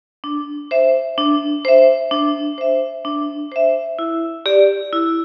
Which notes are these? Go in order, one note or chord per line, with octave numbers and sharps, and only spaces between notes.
D4
C5 E5
D4
C5 E5
D4
C5 E5
D4
C5 E5
E4
G4 D5
E4